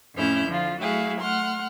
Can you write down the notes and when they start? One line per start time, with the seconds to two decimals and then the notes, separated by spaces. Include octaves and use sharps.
0.15 F2 A2 C#4 E4 F6 G6
0.47 D3 F3 F4
0.80 F#3 A3 E4 F#4 G#4 F5
1.20 A3 F#5 C6 F6